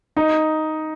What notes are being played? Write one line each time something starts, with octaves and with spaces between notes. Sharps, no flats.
D#4